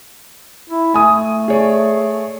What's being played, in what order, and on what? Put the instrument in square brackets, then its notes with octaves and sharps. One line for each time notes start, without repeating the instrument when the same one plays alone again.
[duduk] E4
[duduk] A3 [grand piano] G#5 D#6
[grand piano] G#4 C#5 D5